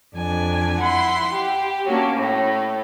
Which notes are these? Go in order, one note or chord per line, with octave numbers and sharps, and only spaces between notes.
F2 D4 G#5
E4 F#5 C6
G4
F#3 A#3 C#4 D4
A2